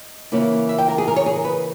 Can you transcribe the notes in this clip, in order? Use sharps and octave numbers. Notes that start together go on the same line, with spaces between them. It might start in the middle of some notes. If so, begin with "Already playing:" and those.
Already playing: D#5
C#3 E3 A#3 C#4 E4
E5
G5
A#4
G#4
A#4
C#5
G#4
A#4
B4